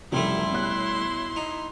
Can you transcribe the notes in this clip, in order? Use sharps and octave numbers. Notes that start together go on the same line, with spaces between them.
F#1 C2 F3 G3 A3 E4 C6
B2 C#5 F#6
D#4